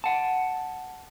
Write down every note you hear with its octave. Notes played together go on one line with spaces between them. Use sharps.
F#5 A5